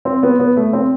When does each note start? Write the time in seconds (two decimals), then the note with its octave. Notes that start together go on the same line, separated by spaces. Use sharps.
0.05 C4
0.23 B3
0.39 B3
0.57 A3
0.73 C4